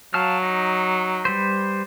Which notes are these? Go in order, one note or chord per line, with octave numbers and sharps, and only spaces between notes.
F#3 F5 A5 F6
D#4
G3 B4 C5